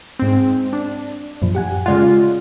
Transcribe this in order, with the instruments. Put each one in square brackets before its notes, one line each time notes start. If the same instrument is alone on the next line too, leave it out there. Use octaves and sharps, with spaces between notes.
[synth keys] G#2 C4
D4
[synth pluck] F#2 A#2 F3
G4 F#5 G#5
[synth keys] C#3 G#3 F4 [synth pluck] D5 F#5